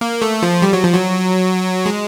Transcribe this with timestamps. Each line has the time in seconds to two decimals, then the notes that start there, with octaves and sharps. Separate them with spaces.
0.01 A#3
0.22 A3
0.42 F3
0.62 G3
0.73 F#3
0.84 F3
0.94 F#3
1.86 G#3